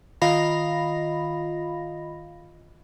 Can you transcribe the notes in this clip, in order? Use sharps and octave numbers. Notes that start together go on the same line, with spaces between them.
D#3 F4 D#5 F5 B5 A#6